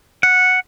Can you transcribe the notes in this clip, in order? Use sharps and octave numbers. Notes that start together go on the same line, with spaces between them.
F#5